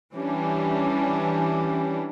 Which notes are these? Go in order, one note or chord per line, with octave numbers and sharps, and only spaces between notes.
E3 G3 C#4 D4